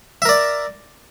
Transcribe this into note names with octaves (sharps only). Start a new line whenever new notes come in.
A#4 D5 E5